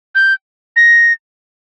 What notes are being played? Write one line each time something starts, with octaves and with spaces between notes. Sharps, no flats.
G6
A#6